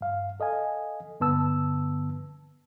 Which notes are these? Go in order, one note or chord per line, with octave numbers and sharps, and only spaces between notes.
G2 F5
A4 D#5 F5 G#5
G2 D3 B3 A5 E6